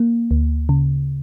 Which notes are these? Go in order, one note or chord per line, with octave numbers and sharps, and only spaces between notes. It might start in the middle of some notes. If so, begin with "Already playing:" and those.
Already playing: A#3
D2
C#3